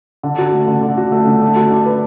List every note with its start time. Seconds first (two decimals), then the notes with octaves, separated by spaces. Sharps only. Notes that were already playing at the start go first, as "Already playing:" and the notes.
0.23 D3
0.38 F#4
0.53 A3
0.68 D3
0.82 D3
0.97 F#4
1.12 A3
1.27 D3
1.42 A3
1.56 F#4
1.71 D4
1.86 B4